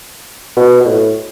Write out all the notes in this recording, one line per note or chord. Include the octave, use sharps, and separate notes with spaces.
B2
B2
A2